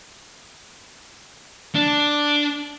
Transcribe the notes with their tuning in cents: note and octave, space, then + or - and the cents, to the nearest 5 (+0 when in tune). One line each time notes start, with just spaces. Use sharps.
D4 +0